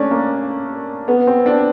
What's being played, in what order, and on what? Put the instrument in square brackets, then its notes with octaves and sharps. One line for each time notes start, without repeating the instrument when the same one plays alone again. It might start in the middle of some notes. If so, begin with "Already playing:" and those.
Already playing: [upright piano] A3 C#4 D4
A#3
B3
C4
D4